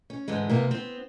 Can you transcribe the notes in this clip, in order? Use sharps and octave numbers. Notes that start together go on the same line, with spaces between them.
C#4
G#2 D3 E3 G#3
C3 A#3 B3
B3 C4